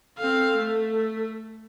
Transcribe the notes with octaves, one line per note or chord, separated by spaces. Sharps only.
C4 A4 F5
A3